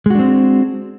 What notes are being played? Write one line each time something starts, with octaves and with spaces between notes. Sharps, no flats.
G#3 C4 D4 F#4